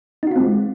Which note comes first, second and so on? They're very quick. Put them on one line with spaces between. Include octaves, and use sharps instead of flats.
D#4 F#4 F4 C4 G#3